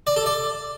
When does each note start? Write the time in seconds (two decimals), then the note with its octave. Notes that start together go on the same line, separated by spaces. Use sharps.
0.07 D5
0.16 A4
0.26 D5